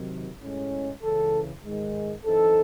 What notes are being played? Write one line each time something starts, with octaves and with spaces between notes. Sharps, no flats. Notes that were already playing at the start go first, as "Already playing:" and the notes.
Already playing: C3 D#3 F#3
A2 G#3 C#4
C#2 C#3 E3 A4
G#2 D#3 G#3
F#2 E3 C4 D#4 A4